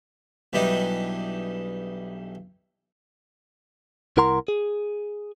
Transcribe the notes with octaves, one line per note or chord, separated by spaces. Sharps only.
B1 E3 G3 D4 D#4
C2 E4 A#4 F#5 A#5 C6
G#4